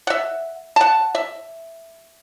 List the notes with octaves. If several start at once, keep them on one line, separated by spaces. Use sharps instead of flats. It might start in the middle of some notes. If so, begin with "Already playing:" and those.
E5 F#5
F#5 A5
E5